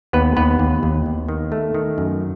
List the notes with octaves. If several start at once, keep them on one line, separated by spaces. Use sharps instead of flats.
D#2 B3 B4
D#2 B3 B4
D#2
D#2
D#2
D#3
A3
D#3
F#2